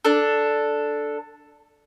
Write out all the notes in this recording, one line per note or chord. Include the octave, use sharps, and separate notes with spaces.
D4 A4